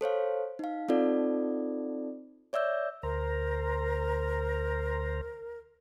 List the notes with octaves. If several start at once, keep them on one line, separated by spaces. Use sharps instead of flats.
A4 C5 C#5 F5
D#4 F5
C4 D#4 F4 A4 D5
C#5 D5 E5 E6 G6
D2 A#4 C5 A#5